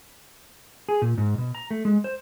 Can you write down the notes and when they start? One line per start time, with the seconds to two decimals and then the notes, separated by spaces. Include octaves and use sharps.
0.89 G#4
1.02 A#2
1.18 G#2
1.38 B2
1.55 A#5
1.71 A3
1.85 G#3
2.04 C5